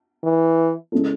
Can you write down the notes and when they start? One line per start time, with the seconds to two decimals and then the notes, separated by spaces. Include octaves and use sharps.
0.24 E3
0.92 C#3 G#3 C#4 E4 A4